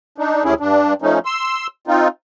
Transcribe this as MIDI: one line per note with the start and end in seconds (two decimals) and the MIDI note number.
0.18 0.44 62
0.18 0.44 63
0.44 0.54 38
0.44 0.54 48
0.44 0.54 61
0.44 0.54 64
0.44 0.54 68
0.60 0.94 43
0.60 0.94 62
1.02 1.19 53
1.02 1.19 57
1.02 1.19 61
1.02 1.19 63
1.25 1.67 84
1.25 1.67 88
1.88 2.08 60
1.88 2.08 63
1.88 2.08 65